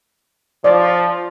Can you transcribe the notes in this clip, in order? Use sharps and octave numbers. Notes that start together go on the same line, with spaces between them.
F3 D5